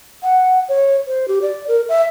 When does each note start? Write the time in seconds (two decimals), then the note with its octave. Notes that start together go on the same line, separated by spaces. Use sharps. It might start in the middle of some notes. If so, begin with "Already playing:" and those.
0.23 F#5
0.69 C#5
1.07 C5
1.28 G4
1.42 D5
1.68 A#4
1.89 E5